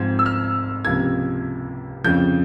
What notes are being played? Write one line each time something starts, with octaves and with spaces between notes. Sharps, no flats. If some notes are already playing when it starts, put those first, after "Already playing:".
Already playing: G#2 F3 C4 G#6
E6
F6
C#2 C3 F3 A#3 F4 G#6
F2 C#3 F3 G6